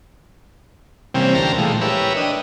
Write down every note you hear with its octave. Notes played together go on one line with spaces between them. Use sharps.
C3 E3 G3 A#3 C4 C#4
D2 G4 A#4 A5 A#5 C6
A#2 E3 F3 G#3 A3
G4 A#4 B4 C#5 E5
D4 D#5